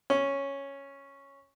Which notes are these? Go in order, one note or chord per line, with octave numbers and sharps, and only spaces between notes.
C#4